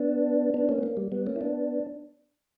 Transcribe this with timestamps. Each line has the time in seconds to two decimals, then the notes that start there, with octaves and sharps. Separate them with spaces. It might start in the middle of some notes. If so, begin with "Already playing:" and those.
Already playing: B3 D4
0.54 B3 D4
0.69 A#3 C#4
0.78 B3
0.83 A#3
0.97 G3
1.12 G3 B3
1.26 A#3 C#4
1.36 E4
1.41 B3 D4